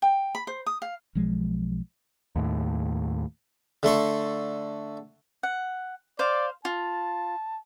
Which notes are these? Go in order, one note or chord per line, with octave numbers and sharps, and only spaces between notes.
G5
B5
C5
D#6
F5
B1 F3 G#3
D#2 A2
D3 A3 C6 C#6
F#5
C5 D5 F5
F4 A5